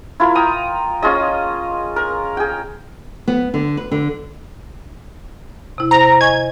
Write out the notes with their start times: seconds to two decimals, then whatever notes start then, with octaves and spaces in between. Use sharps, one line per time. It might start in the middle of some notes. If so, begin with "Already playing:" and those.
0.20 E4 F4 A#4
0.35 G5 A#5 D#6
1.02 C#4 F4 G#4 D#5
1.96 A#4
2.37 G#4 G5
3.28 B3
3.54 D3
3.77 B4
3.92 D3
5.78 C3 E4
5.91 C5 A#5
6.21 D#5 G#5 C#6 G#6